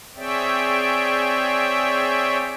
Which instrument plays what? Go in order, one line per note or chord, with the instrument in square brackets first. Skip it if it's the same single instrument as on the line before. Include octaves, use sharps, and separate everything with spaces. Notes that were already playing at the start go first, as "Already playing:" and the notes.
[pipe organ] C4 G#4 C#5 D5 E5 G5